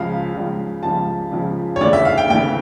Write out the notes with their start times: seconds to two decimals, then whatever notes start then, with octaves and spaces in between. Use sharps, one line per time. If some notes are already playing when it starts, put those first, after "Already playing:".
Already playing: C#2 C#3 F3 F5
0.34 C#2 C#3 F3
0.83 C#2 C#3 F3 A5
1.32 C#2 C#3 F3
1.76 C#5
1.81 D2 C#3 E3 D5
1.93 E5
2.05 F5
2.18 G5
2.30 D2 C#3 E3 G5